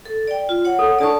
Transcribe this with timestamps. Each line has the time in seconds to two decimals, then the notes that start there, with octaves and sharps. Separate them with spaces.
0.05 A4
0.27 D5 G5
0.49 F4
0.65 C#5 F#5
0.79 A4
0.99 D4 A4 D5 A5 C#6